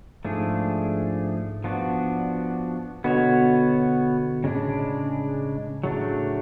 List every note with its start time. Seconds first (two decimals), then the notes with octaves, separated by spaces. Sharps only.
0.25 G#2 F3 A3 D4 G#4
1.64 F3 B3 D4 F#4
3.04 B2 D3 B3 F#4 C#5
4.44 A2 C#3 G#3 D4
5.83 A2 C#3 F#3 A3 D4